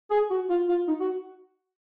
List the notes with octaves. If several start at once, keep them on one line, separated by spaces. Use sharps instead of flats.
G#4
F#4
F4
F4
D#4
F#4